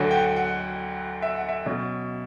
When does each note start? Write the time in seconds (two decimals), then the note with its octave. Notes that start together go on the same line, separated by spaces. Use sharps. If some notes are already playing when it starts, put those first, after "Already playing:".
Already playing: D2 D3 F#3
0.11 G5
0.14 F#5
0.36 F#5
1.22 E5
1.36 F#5
1.49 E5
1.66 B2 F#3 C#4